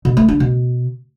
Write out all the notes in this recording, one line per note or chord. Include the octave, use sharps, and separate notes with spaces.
B2
A3
D4
B2